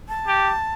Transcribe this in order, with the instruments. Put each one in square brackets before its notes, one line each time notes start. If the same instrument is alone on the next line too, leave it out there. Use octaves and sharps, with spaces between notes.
[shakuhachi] A5
[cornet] G4